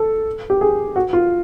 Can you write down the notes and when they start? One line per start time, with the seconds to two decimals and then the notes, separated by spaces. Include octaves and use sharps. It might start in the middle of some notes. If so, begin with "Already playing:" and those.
Already playing: A4
0.50 G4
0.61 G#4
0.96 F#4
1.13 F4